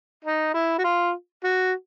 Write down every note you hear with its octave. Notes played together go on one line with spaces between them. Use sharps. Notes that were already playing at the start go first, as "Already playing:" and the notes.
D#4
E4
F#4
F4
F#4